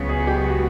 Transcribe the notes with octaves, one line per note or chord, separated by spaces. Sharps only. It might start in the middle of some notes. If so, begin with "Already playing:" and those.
Already playing: C#2 C#3 F#3 B3
G#4
G4
F#4